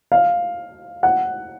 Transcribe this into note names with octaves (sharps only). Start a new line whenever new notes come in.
F5
F#5